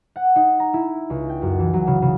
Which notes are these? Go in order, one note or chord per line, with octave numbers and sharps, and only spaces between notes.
F#5
D#4
A#5
E4
C#2
G5
F#2
E3
F#3
C#3
C#3